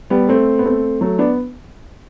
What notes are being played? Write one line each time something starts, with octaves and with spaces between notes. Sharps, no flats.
G3 B3
A3 C4
B3
A3 C4
F#3 A3
B3 D4